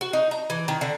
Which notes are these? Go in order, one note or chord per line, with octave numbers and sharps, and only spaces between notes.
F#4
D#4
A#5
E3
D#3
D3